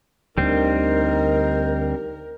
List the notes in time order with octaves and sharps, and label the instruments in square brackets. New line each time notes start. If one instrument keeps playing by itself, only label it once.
[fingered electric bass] D2 D3 [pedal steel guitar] G3 C4 [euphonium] D#4 [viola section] A#4